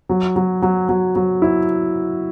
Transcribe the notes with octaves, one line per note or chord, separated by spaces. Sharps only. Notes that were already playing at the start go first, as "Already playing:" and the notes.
F#3
F#3
F#3
F#3
F#3
E4